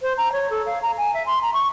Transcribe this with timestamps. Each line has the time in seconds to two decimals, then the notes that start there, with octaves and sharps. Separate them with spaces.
0.02 C5
0.18 A#5
0.33 C#5
0.51 A4
0.66 F5
0.82 A#5
0.98 G#5
1.14 E5
1.26 C6
1.42 A#5
1.54 C#6